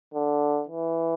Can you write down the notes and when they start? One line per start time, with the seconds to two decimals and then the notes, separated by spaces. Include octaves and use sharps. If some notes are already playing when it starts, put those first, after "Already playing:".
0.14 D3
0.69 E3